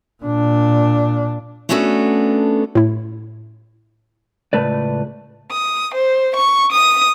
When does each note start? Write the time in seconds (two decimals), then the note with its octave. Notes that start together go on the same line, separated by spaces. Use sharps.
0.23 A#2 D4
1.69 A3 B3 C#4 D4 F#4 A4
2.75 A2 E4
4.53 C#2 F#2 A2 A3 B4 D5
5.51 D#6
5.94 C5
6.36 C#6
6.72 D#6